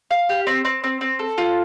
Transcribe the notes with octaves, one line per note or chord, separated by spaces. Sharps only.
F5
G4
C4
C4
C4
C4
A4
F4